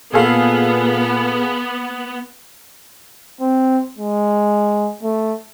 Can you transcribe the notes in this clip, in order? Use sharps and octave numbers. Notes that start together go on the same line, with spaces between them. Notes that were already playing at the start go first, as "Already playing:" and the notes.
A#2 B3 G#4 A4 F5
C4
G#3
A3